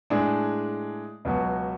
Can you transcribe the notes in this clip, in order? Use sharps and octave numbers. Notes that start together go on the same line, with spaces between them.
A2 G#3 D4 G#4
C#2 B2 F#3 B3 F#4